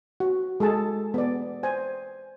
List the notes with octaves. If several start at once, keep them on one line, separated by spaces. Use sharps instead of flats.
F#4
G#3 G#4 A4 A5
B3 D5
C5 G#5